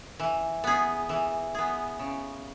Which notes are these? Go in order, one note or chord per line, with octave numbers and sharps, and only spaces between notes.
E3
B3 G#4
E3
B3 G#4
C#3